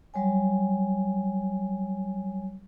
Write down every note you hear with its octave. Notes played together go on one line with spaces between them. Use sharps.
F#3 G3 C#5 G#5